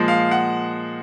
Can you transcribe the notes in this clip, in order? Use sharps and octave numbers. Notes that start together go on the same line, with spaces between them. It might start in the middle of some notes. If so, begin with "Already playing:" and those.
Already playing: A#2 F3 G#3
F5
F#5